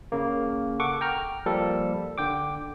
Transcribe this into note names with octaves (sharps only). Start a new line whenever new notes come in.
C#3 A#3
A4 F#5 C#6 D6
G5 A#5 F6
F3 G3 A#3 A4
D3 G5 D6